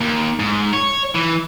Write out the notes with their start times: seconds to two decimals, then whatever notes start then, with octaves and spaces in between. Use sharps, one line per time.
0.01 D#2
0.40 G#2
0.74 C#5
1.15 E3